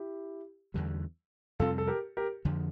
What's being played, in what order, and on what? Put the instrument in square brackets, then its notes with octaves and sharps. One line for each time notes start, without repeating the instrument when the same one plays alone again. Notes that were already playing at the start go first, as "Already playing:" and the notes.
Already playing: [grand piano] E4 G4
[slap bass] E2 D3 G3
[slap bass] F2 C3 G3 C4 [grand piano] F4 A4
[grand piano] A4
G4 A#4
G4 A#4
[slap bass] F2 D3 F3